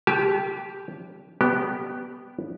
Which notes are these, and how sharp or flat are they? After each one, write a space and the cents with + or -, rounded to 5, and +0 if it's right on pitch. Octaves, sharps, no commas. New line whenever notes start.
G4 +0 A5 -45
B3 +0 G4 -20 D5 +0